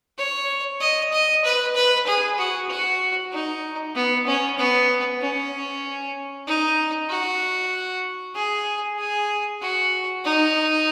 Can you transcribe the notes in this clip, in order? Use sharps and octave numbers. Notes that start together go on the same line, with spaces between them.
C#5
D#5
D#5
B4
B4
G#4
F#4
F#4
D#4
B3
C#4
B3
C#4
D#4
F#4
G#4
G#4
F#4
D#4